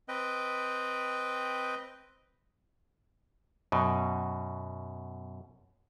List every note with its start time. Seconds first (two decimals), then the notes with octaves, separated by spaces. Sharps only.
0.08 C4 B4 D#5 G5
3.72 F#2 B2